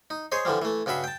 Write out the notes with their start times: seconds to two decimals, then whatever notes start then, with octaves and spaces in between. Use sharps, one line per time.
0.10 D#4
0.32 G#4 C5 C#5 D#5
0.45 D3 E3 F3 G3
0.62 E3 A3
0.86 G2 C#3 F#4 E5 B5
1.04 G5 A5